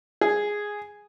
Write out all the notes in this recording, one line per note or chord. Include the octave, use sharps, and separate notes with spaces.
G#4